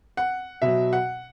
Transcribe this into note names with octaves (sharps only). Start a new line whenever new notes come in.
F#5
B2 F#3 E5
F#5